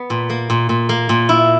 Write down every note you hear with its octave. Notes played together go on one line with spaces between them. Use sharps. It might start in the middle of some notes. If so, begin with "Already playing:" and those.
Already playing: B3
A#2
A#3
A#2
A#2
A#3
A#2
E4